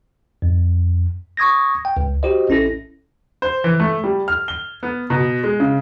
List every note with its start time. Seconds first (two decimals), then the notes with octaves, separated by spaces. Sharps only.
0.42 F2
1.37 C#6 D#6 G#6 A#6
1.85 G5
1.97 C#2
2.23 F#4 G4 C5 D#5
2.49 A1 C#4 E4 A4 A#6
3.42 C5
3.64 E3
3.80 A3
4.04 G3
4.28 F6
4.48 G7
4.83 B3
5.10 B2
5.44 G#3
5.60 C#3